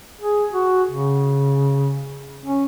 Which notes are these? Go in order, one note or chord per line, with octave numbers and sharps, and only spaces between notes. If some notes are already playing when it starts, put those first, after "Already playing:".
G#4
F#4
C#3
C#4